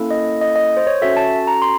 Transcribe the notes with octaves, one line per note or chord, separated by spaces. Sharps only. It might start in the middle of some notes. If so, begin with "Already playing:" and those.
Already playing: A#3 C#4 E4 A4
D#5
D#5
D#5
C5
C#5
C#4 F#4 A4 E5
A5
A#5
C6